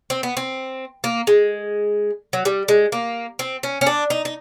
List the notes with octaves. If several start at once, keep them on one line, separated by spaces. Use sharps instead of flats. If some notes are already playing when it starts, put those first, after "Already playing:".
C4
B3
C4
A#3
G#3
F#3
G3
G#3
A#3
C4
C#4
C#4
D4
D#4
D#4